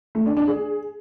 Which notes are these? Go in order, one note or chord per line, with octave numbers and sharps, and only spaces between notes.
A3
D4
D4
G#4